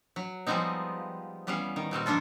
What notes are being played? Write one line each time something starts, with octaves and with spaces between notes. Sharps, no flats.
F#3
F3 G3 G#3 B3 C4 D#4
E3 G3 B3 C#4 F5
D#3
A#2 G3 C4 F#4
F3 A#3 D4 F4 A4